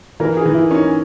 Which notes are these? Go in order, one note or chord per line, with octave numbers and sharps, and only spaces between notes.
E3 A#4
G#4
E3
E4
C#4 D#4